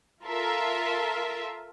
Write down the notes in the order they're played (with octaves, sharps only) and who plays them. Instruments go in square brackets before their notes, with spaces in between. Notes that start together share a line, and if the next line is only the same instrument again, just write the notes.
[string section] F4 A4 A#4 E5